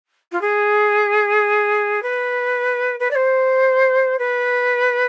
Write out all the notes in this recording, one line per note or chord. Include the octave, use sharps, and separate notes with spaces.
F4
G#4
B4
B4
D5
C5
B4